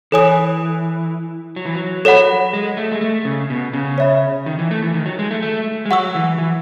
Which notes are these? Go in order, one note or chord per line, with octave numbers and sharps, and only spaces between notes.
E3 A4 C#5 G#5 D#6
F#3
E3
F#3
A4 C#5 F#5 B5
G#3
A3
G#3
A3
C#3
B2
C#3
C#5 E5 B5
D#3
E3
A3
E3
D#3
F#3
G#3
A3
A3
G#3
F#3 F#5 C#6 E6
E3
E3